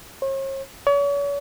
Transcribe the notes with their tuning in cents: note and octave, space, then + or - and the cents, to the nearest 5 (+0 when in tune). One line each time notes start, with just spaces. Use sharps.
C#5 -45
C#5 +40